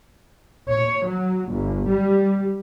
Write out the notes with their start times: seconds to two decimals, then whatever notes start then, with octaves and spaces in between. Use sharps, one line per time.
0.69 C#5
1.03 F#3
1.48 G1
1.87 G3